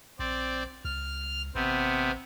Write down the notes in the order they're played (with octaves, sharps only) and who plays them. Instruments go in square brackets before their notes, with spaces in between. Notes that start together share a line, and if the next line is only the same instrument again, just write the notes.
[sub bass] A#1 [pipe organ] C4 D5
[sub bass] C#2 [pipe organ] F6
[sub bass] A1 [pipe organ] C3 B3 C4